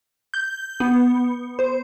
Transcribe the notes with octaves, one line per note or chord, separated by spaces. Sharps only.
G6
B3
C5